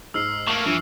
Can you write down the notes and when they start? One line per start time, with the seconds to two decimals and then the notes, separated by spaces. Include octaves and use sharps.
0.14 G#2 E6 F6 C7
0.47 A3 A#3 C#6 F7 F#7
0.65 G2 E3 F3